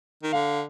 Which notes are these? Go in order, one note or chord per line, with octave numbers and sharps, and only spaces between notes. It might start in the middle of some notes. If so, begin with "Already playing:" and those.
D#3
D3 F5